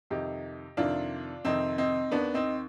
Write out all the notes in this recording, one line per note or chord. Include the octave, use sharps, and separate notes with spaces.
F2 C3 D#3 D#4 G4
F2 C3 D#3 D4 F4
F2 C3 D#3 C4 D#4
C4 D#4
D#2 D#3 B3 D4
C4 D#4